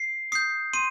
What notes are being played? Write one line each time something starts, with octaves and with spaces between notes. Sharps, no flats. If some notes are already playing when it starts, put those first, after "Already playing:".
Already playing: C7
D#6 G6 C7
C6 D#7